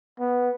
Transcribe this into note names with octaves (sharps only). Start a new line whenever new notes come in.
B3